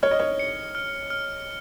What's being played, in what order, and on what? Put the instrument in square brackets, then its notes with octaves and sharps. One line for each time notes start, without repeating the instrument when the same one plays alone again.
[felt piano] C#5 [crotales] F6
[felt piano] D#5
C#5
[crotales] C#7
F6
F6